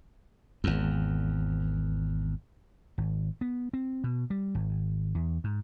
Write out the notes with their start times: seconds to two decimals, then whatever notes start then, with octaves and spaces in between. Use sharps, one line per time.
0.64 G#1 E2
2.98 G#1
3.41 B3
3.73 C4
4.04 B2
4.30 G3
4.55 G#1
5.15 E2
5.44 G#2